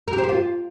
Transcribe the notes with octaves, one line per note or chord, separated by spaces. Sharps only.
A#4
G4
C5
G4
F4